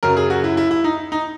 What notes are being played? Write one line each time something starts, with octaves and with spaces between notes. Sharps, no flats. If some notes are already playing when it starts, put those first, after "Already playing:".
F#2 C#3 F#3 A#4
G#4
F#4
E4
E4
E4
D#4
D#4